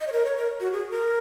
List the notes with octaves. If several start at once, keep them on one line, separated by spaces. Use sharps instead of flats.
D#5
C#5
A#4
C#5
A#4
F#4
G#4
A#4